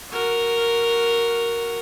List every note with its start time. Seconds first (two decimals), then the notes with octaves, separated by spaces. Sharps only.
0.11 F#4 A#4